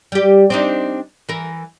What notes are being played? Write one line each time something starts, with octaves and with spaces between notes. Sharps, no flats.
G3 G4
C4 D4 D#4
E3 A#4